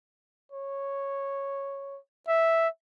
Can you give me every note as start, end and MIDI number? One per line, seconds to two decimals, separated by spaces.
0.52 1.98 73
2.28 2.68 76